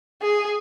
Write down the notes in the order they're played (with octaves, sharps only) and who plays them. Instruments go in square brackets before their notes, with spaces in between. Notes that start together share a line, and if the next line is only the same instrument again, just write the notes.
[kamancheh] G#4